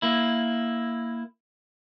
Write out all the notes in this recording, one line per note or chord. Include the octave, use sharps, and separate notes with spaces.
A#3 E4